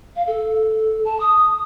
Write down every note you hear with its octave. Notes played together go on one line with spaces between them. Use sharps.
F5
A4
A5
D#6